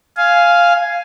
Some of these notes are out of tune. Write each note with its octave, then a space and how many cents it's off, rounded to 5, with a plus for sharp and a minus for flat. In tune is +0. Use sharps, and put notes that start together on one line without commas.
F5 -5 G#5 +5